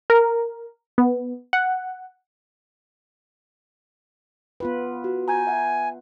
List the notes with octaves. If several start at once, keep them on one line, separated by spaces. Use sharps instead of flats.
A#4
B3
F#5
B3 F4 B4
F#4
G#5 A#5 G6 G#6
E5 F#5